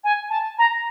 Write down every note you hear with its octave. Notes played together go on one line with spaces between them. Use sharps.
G#5
A5
A#5